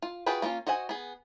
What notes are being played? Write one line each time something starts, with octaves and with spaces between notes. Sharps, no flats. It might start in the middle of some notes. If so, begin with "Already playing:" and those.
F4
F4 F#4 G#4 B4 G5
A#3 B3 C#4 F4
F#4 C5 D#5 F#5 G#5
B3 G#4